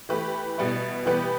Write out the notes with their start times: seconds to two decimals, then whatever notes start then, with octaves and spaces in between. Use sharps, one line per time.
0.09 E3 A3 G4 B4
0.58 B2 G3 B3 E4
1.06 E3 G3 B3 G4 B4